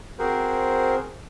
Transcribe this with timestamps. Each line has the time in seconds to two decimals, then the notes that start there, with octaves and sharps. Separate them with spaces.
0.19 C4 F#4 G#4 A#4 C5